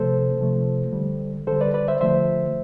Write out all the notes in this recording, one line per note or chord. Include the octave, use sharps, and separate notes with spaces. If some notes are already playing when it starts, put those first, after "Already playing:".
Already playing: C3 F3 A3 A4 C5
C3 F3 A3
D3 G3
D3 G3 A4 C5
B4 D5
B4 D5
C5 E5
D3 F3 A3 C5 E5